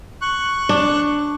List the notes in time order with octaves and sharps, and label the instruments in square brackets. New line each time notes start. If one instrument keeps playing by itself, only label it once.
[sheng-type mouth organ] C#6 F#6
[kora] D4